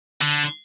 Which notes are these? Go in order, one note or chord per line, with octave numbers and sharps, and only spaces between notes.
D3